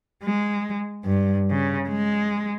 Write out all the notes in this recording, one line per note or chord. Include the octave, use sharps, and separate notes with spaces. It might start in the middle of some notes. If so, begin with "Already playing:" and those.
G#3
G2
C#3
G#3